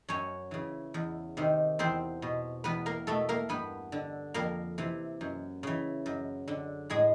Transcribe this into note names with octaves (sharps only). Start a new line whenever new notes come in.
F#2 C#4 C#5
C#3 E3
E2
C3 D#3
E2 C4 C5
B2
E2 B3 B4
A#3 A#4
B2 A3 A4
A#3 A#4
G2 B3 B4
D3
F2 A#3 A#4
C3 E3
F#2
C#3 E3
F#2
D3
A2 G#3 G#4